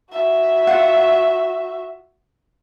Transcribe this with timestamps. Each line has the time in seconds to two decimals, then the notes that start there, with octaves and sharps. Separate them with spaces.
0.11 F#4 E5
0.67 F4 F#5